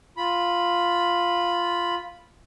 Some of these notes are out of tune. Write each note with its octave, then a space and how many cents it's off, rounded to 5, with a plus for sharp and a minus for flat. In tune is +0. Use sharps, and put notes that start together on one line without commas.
F4 +0 B5 +0